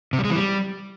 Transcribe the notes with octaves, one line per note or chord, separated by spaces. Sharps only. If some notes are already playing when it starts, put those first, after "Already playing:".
C3
G3
G#3
E3
G3